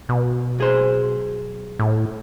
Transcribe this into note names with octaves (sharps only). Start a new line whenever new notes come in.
B2
B1 G#4 C5
A2